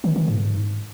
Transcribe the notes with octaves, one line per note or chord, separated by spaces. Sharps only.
D#3
D#3
G#2